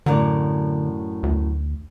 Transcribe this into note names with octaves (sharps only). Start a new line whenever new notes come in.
F#2 A2 D3 D5
D2